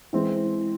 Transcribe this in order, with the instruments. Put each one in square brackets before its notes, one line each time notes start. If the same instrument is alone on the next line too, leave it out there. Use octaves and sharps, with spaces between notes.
[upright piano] E3 G#3 C4